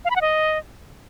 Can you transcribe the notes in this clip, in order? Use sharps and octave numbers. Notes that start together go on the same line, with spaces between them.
F5
B5
F#5
D#5